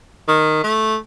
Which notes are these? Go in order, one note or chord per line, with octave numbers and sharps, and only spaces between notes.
D#3
A3